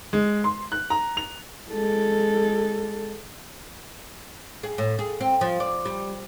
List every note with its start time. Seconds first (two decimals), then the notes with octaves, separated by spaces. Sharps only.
0.13 G#3
0.44 C6
0.72 F#6
0.90 A#5
1.17 F7
1.72 G#3 A4
4.63 G#4
4.78 A2
4.99 G#4
5.20 C4
5.41 F3
5.60 D5
5.85 G3